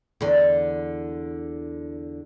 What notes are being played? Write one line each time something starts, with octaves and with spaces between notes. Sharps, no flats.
E2 D3